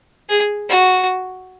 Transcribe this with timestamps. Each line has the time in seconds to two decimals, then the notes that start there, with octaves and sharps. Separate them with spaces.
0.29 G#4
0.69 F#4